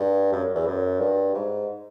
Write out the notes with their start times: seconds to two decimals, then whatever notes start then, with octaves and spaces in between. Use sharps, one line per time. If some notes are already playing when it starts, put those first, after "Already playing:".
Already playing: G2
0.32 F#2
0.55 E2
0.67 F#2
1.00 G2
1.35 G#2